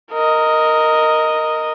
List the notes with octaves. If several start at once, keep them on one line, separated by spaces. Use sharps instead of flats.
A#4 D#5